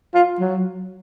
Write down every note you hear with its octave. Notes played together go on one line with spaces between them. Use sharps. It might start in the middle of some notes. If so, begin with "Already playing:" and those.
F4
F#3